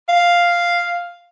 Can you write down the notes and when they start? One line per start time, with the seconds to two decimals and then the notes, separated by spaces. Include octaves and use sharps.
0.09 F5